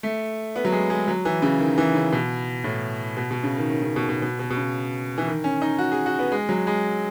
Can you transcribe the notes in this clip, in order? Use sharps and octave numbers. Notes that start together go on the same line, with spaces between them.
A3
B3
F#3
G#3
G#3
F#3
E3
C#3
D#3
E3
C#3
B2
A2
B2
B2
C#3
D#3
D#3
C#3
B2
B2
B2
B2
B2
C#3
E3
D#3
C#4
D#4
F#4
G#4
F#4
B3
G#3
F#3
G#3